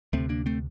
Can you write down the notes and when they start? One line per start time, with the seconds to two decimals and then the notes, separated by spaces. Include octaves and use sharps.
0.13 D2 C3 A3 C4
0.29 A#3 D4
0.46 A3 C4